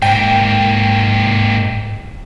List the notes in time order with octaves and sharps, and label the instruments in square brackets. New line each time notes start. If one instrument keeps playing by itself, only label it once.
[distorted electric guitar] G#2 A#3 [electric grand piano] G5